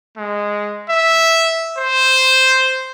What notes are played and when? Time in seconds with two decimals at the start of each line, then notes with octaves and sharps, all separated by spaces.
0.17 G#3
0.90 E5
1.78 C5